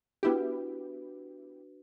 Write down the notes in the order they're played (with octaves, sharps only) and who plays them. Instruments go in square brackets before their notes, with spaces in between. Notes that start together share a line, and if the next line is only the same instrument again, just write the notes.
[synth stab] B3 E4 G4 [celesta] D4 F#4 B4